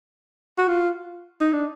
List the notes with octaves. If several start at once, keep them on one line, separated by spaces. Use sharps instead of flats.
F#4
F4
D#4
D4